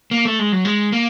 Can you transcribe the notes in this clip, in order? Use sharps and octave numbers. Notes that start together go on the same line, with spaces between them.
A#3
A3
G#3
F#3
G#3
A#3